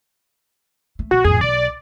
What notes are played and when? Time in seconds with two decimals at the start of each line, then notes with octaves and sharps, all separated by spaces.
0.99 A3
1.11 B1 F#4
1.24 A1 F2 G#4
1.41 B1 D5